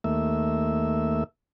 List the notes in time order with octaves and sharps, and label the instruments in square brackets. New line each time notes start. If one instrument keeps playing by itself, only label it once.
[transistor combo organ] D#2 A3 A#3 E5